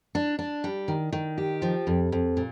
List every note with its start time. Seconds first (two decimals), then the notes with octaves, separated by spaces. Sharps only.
0.15 D4
0.39 D4
0.64 G3
0.88 D#3
1.12 D#3
1.38 G4
1.62 F3
1.87 F2
2.12 F2
2.37 A#2